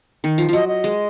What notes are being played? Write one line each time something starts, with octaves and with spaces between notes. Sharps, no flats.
D#3
F3
F3 F#3 D#5
D#5
G#3